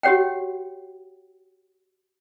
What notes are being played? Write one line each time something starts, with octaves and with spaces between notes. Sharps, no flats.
F#4 G4 C#5 F#5 G5